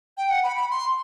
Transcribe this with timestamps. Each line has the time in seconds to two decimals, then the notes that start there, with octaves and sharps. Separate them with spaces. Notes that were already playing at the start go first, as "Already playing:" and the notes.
0.17 G5
0.30 F#5
0.43 B5
0.56 B5
0.71 C6